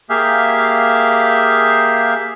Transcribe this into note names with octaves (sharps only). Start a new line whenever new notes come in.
A#3 G4 G#4 E5 F5